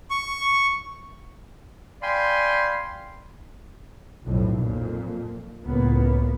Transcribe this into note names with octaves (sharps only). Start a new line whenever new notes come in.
C#6
D5 F5 G5 G#5 B5 C6
B1 F2 A2
F2 A#2
C#2 A2 A#3 B3